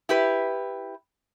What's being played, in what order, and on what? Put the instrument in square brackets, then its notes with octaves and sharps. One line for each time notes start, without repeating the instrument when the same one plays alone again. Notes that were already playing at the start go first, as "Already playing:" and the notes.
[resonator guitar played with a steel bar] E4 G4 B4